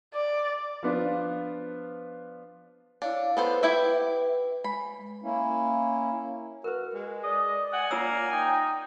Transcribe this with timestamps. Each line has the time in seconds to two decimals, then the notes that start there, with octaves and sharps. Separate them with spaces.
0.14 D5
0.83 F3 B3 D4 F4
3.02 D4 E4 C#5 F5
3.37 B3 A4 B4 C5
3.63 E4 G4 E5
4.64 G#3 B5
5.23 A#3 C#4 E4
6.64 F#4 A#4 B4
6.94 G#3
7.23 D5 D#5
7.73 F#5 G#5
7.91 A#3 F4 C#5 E6
8.32 D#4 G5